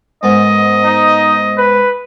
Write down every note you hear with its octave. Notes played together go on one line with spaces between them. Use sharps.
G#2 B3 A#4 D#5
D#4
B4